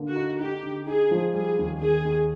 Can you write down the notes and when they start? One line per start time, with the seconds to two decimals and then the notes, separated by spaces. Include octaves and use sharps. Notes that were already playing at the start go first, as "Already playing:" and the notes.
Already playing: D3 A#3
0.08 F#4
0.16 D#4
0.39 D#4 G4
0.63 D3
0.86 D#4 G#4
1.11 F3
1.34 G3 G#4
1.58 D#2
1.81 D#3 G#4
2.05 D#2